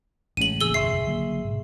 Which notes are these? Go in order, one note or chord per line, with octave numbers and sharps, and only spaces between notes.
A1 C#3 G#3 D#7 F#7
E1 E3 A#3 G#4 E6 G7
E1 B1 F#2 E5 C6 C#6 C7
D3 F#3 A#3
G#2 B2